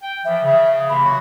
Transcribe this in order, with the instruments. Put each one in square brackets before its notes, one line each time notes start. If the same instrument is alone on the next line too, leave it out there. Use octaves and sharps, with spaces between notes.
[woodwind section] G5
[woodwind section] E3 F3 [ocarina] E5
[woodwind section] C#3
[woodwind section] C3 E3 A#3 [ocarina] B5
[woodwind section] F#3 F#4